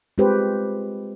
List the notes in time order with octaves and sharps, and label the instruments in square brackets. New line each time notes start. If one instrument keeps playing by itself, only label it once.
[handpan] G#3 C4 F4 G4 B4 C5